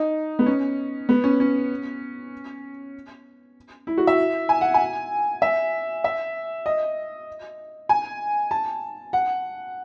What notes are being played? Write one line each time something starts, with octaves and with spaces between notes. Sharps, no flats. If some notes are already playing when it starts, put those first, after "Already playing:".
Already playing: D#4
B3
C#4
B3
C#4
C#4
E4
F#4
E5
G#5
F#5
G#5
E5
E5
D#5
G#5
A5
F#5